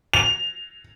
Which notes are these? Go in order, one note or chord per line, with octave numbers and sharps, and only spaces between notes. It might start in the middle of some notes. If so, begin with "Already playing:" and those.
F7